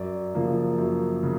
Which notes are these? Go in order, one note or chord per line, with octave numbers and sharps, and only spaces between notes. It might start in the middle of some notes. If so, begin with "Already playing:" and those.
Already playing: F#2 D5
C#3 F3 A#3
F#2
C#3